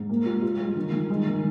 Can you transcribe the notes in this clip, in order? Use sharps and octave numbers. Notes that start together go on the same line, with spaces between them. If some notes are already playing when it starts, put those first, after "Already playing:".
Already playing: G#2
A#3
F4
F4
G#3
D#3
D#3
G#3
D#3